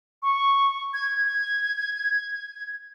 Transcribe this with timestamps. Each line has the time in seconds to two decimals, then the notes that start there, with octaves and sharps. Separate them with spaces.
0.23 C#6
0.94 G#6
1.25 G#6